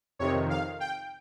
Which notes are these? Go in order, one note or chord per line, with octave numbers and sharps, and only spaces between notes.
F2 C3 D#3 C#5
F5
G5